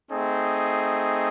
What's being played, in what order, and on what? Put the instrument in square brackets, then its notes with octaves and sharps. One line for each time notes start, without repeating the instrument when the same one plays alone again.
[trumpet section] A3 C4 D#4 G#4